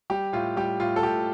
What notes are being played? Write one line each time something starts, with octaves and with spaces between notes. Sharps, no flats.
G3 G4
A2 F4
G3 G4
A2 F4
A4
A2 G4